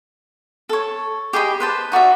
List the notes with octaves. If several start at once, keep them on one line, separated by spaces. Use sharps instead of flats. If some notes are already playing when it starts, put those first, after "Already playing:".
A4 C#5
G4 G#4 D#5 B5
B4 C5 A5
D#4 F#4 D5 E5